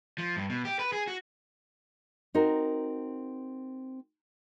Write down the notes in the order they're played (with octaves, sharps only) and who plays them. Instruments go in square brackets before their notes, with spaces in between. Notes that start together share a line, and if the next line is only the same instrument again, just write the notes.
[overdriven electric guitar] F3
G2
B2
G4
B4
G#4
F#4
[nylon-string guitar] C4 D#4 F#4 A#4